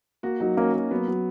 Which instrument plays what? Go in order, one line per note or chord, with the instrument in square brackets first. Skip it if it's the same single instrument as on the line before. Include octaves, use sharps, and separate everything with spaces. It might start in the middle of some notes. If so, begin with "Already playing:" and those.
[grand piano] A#3 [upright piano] F#4
[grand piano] F#3 [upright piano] D#4
[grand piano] A#3 [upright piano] C#4
[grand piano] A#3
[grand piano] F#3 [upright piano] B3
[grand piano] F#3